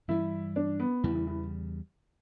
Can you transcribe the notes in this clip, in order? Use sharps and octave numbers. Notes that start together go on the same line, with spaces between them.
G2 E3 G3 E4
D4
B3
E2 C#3 E3 G3
E3
E3